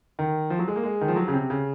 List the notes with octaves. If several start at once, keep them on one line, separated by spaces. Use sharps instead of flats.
D#3
F3
F#3
G#3
A#3
G#3
D#3
F3
F#3
C#3
C3
C#3